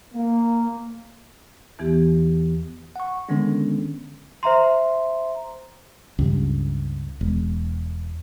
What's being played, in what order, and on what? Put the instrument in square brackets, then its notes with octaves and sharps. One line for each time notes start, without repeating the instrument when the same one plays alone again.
[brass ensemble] A#3
[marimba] E2 E3 B3 G4
[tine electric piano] F#5 C#6
D3 D#3 G#3 B3 C#4 D4
[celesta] C5 E5 A#5 C6
[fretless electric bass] C#2 G2
E1